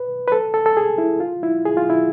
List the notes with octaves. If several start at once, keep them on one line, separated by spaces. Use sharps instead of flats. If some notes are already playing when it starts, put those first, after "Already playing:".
Already playing: B4
B4
A4
A4
A4
G#4
E4
F4
E4
G#4
F4
E4